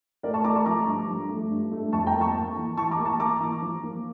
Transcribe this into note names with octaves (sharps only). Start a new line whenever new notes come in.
A3 A#4 D5
A5 C#6
A3 A#5 D6
A5 C#6
F3 A#5 D6
G2
F3
A3
G2
A3
F2 A5 C#6
G5 A#5
A#3
A5 C#6
A#3
E3
E3 A5 C#6
A#5 D6
A#3
A5 C#6
A#3 A#5 D6
E3
F3
A#3